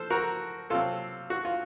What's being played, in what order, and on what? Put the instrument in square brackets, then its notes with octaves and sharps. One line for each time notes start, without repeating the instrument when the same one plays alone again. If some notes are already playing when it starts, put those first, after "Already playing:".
Already playing: [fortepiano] F3 A4 C5
F#4 A#4
C3 F#3 C4 F4 A4
F#4
F4